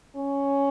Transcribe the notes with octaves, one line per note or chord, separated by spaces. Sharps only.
C#4